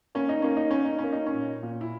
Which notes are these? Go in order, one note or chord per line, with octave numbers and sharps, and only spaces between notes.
A#3 C#4
D#4
A#3 C#4
D#4
A#3 C#4
D#4
C#4
A#3
D#4
C#4
A#2
A#2
E4